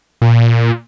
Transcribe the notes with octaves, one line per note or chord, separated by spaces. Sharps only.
A#2